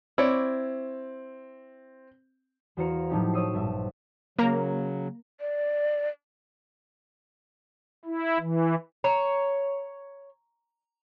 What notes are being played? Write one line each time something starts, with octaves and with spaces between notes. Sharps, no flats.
C4 E4 C#5 D5
E2 F#4 C5 F5 A#5 C#7
A2 F3 F#3 D4 D#4 G4
C5 C#5 C6 D#6 E6 C7
A#1 G2 E5 D#7
C#3 F#3 A#3 A#4 A#5
D5
E4
E3
C#5 A#5